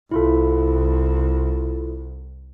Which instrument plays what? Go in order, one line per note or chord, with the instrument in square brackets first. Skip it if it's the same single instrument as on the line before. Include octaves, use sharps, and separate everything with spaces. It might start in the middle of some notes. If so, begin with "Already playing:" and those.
[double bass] C2 [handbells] E4 F4 A4